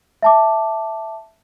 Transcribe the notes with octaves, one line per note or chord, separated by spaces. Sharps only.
E5 A5 D6